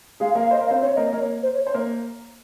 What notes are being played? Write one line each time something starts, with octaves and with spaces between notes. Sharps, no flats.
G#3 G#4 F5
A#3 A#4
F5
C5 D#5
A#4
F5
C4 C5
C4 C5 C#5
A#3 A#4 D#5
C#5
A#3 A#4
C5
C#5
C5 C#5
A#3 A#4